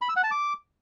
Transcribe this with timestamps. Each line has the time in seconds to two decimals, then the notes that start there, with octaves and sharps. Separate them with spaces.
0.01 B5
0.09 E6
0.16 F#5
0.24 A5
0.31 D6